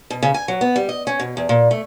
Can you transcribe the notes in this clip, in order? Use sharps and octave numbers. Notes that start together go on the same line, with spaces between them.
B2
C#3
G#5
F#3
B3
G3
D#5
C#4
B2
E2
A#2
A3